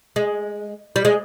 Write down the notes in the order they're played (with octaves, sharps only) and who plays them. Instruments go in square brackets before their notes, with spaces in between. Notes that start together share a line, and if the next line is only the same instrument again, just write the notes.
[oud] G#3
G3
G#3